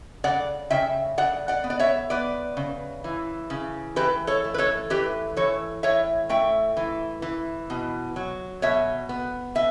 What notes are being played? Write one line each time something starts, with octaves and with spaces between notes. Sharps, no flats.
C#3 D5 F#5
C#3 E5 G5
C#3 D5 F#5
D5 F#5
B3
D5
C#5 E5
B3 B4 D5
C#3
E3
C#3
E3 G4 B4
A4 C#5
A3
B4
A4 C#5
E3 G4 B4
E3 A4 C#5
A2 C#5 E5
A3 E5 G5
E3
E3
B2
F#3
B2 C#5 E5
B3
B2 E5